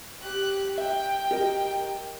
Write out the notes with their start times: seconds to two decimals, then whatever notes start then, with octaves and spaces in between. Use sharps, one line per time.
0.21 G4 F#6
0.78 E5 G5
1.31 G4 A#4 D#5